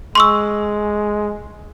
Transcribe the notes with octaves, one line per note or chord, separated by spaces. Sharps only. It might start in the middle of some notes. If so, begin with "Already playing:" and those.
G#3 C6 C#6 E6